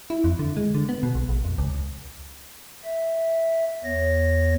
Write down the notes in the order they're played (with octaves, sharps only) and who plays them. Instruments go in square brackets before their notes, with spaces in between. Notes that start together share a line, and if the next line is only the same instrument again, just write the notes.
[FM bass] E4
F2
D3
G#3
D3
B3
B2
B1
A#1
F2
C#2
[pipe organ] E5
E2 B3 C#5 A#6